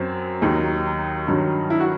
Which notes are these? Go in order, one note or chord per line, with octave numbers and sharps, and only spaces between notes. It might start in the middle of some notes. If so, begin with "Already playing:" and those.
Already playing: F#2 F#3 C4
D#2 D#3 F#3 D#4
G2 D#3 F#3
E4
F#4